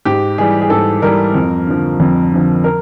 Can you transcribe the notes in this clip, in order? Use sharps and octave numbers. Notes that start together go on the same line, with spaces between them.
G#2 G4
E3 G3 G#4
G#4
G#2 A4
E3 G3 A#4
F2
D3 F3
F2
D3 F3
A#4